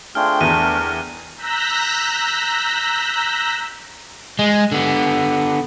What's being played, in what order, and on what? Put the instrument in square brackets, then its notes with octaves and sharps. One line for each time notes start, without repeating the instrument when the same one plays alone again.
[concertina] A3 D4 G5 [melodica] C4 F4 G#4 [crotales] F6
[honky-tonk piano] E2 [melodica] A#4 [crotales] D#7
[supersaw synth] A#5 E6 F#6 G6 A#6 B6
[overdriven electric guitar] G#3
D3 B3